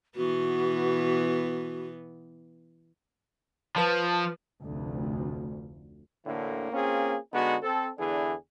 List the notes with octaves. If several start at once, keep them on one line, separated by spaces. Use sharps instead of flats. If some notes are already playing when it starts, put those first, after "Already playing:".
B2 E3 B3 F#4
F3 B4 A5
F1 D2
D2 A2 D3 E3 A#3
A#3 C4 C#4 F4 G#4
D3 G#3 B3 D#4 F#4
C4 A4
E2 D3 E3 D4 G#4